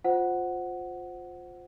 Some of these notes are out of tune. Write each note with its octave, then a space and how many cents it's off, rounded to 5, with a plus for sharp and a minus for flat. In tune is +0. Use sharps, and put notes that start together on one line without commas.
F4 +20 C5 +0 F#5 +0